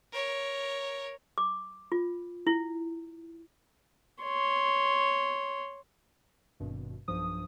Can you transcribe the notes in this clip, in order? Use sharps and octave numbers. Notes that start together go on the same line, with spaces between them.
A#4 C#5
D6
F4
E4
C#5 C6
G#1 G2 B2
B1 G2 F3 D#6